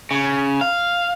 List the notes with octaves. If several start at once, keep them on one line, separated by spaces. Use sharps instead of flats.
C#3
F5